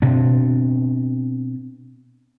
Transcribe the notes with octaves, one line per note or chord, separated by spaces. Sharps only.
B2 C4 D4